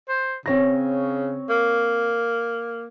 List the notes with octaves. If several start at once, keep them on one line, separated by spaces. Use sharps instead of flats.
C5
C#3 C4 C#5 A#6
A#3